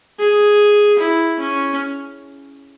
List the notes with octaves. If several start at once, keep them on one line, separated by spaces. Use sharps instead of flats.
G#4
E4
C#4